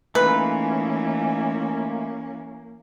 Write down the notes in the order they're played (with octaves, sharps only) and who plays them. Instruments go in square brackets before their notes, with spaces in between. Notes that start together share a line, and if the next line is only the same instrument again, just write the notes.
[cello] E3 C#4 [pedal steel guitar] A3 D#4 F4 [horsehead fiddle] A#3 [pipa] B4